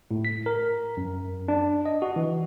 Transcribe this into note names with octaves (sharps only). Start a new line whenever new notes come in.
A2
B6
A#4
F#2
D4
D#5
F#4
E3